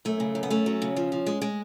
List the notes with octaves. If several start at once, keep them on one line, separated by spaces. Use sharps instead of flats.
F#2 A3
C#3
F#2
B3
A3 C#4
F#3
C#3
F3
F3
G#3
G#3